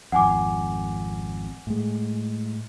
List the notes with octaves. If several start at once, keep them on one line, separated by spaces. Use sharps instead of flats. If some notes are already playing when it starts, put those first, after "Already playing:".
G#1 F2 F#5 G#5 D6
A2 G#3